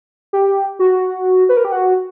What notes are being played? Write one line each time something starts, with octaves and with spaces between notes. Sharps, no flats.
G4
F#4
B4
A#4
G4
F#4